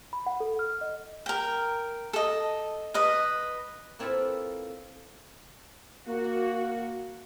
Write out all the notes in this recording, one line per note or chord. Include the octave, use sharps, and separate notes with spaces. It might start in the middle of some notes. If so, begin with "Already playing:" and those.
B5
F#5
A4
F6
D#5
A#4 G5
A4 D#5
B4 D#5
A#3 C4 E4 F4 A4 B4
A#3 F#4